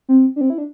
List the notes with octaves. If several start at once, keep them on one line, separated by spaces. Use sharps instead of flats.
C4
D4
C4
E4
D4